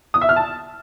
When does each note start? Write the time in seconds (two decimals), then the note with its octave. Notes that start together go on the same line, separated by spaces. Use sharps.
0.14 D#6
0.21 E5
0.29 F6
0.36 A5